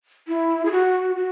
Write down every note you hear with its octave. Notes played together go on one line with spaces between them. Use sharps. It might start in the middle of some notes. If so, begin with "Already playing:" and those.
E4
G#4
F#4
F#4